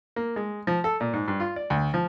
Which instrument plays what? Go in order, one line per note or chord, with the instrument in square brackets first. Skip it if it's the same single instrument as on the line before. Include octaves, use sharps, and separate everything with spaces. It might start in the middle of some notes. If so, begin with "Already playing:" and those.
[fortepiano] A#3
G#3
F3
A4
A#2
G#2
G2
F4
D5
D2
F3